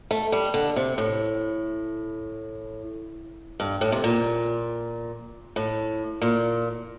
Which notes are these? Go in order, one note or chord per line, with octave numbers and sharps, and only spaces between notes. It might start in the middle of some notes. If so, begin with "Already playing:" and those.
A3
G3
D3
C3
A2
G2
A2
C3
A#2
A2
A#2